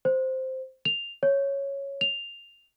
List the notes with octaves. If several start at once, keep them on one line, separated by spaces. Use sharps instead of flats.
C5
F7
C#5
F7